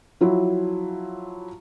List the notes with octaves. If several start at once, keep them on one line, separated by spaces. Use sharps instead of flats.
F3 F#3 E4